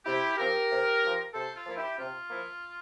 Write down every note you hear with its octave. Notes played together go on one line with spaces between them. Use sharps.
C3 E4 G4
F3 C4 G4 A#4
C3
F3 C4
C3 A4 C5
F4 A4
F3 A#3 E4
E4 G4
C3 F4
F3 A#3 E4